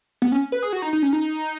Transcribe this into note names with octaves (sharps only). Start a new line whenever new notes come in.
B3
C#4
B4
G#4
F#4
D#4
D#4
C#4
D#4